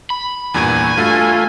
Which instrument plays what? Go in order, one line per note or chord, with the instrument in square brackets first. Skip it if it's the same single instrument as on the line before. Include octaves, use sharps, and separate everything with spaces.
[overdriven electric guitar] B5
[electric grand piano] E2 G2 A#2 [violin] G#5
[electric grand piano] G2 F#4 A6 [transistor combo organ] A3 F4